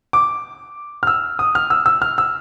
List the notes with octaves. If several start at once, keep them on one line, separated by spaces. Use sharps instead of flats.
D6
F6
E6
D#6
F6
E6
E6
F6
E6